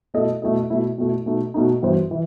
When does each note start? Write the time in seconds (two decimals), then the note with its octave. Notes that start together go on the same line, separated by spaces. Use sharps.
0.14 B2 A3 E4 A4 D#5
0.42 B2 A3 E4 A4 D#5
0.70 B2 A3 E4
0.98 B2 A3 E4
1.26 B2 A3 D#4
1.54 B2 A3 D#4
1.82 G2 E3 B3 F#4 C5
2.11 E3